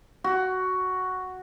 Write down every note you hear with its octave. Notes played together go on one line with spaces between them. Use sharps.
F#4